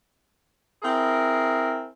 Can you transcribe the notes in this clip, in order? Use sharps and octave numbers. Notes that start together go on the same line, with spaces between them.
C4 E4 G#4 A#4